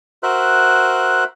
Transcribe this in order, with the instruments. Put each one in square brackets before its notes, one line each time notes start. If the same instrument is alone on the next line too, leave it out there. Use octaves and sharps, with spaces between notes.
[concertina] F#4 A#4 C5 E5 F#6